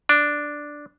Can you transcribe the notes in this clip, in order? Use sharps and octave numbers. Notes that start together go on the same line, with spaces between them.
D4